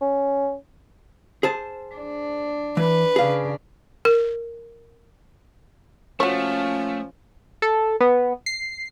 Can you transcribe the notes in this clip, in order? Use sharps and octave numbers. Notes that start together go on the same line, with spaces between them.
C#4
G#4 C5 A5
D4
E3 B4
C#3 D4 G#4 F5
A#4
A#2 F3 A3 C#4 F#4 C#5
A4
B3
C7